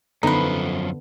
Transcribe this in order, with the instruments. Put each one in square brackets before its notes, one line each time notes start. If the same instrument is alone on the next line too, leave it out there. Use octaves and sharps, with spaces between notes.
[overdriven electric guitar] F#2 F3 [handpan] D3 B3 A4 [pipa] D#4 B4